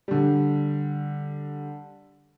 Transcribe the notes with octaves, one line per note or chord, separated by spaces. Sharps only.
D3 G3